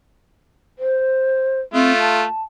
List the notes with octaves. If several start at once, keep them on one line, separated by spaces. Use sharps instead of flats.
C5
A3 C4 F4
A5